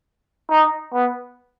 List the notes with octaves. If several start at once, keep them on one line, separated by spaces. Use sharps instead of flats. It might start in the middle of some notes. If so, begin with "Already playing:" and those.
D#4
B3